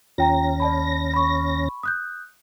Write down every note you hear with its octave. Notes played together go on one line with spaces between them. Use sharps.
D#2 C#4 F4 G5 A#5 A#6
D5 A5 B5
B5 C#6
D#6 F#6 G6